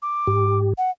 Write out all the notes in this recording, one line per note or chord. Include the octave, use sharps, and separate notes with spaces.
D6
G#2 G4
F#5